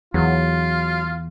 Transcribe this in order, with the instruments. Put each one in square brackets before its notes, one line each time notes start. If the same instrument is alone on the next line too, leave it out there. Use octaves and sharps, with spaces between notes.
[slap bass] E2 [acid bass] F#3 [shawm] F4